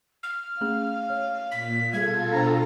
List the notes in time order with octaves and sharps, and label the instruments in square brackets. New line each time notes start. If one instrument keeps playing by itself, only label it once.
[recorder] F6
[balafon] A3 C#4 G#4 [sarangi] F5
[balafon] C#5
[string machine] A#2 [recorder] B6
[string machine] B2 F4 A4 [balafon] G3 G#4 [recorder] G#6
[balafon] D4 C5 G5 [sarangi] A#5